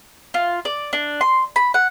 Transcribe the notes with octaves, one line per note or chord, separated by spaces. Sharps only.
F4
D5
D4
C6
B5
F#5